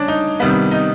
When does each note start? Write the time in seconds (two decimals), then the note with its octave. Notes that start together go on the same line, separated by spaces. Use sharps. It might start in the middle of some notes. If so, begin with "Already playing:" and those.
Already playing: C#3 C#4 D4
0.08 D#4
0.40 C3 D#3 G3 B3
0.71 D#4